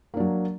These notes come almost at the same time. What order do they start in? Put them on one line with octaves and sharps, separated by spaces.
A#3 D4 F#3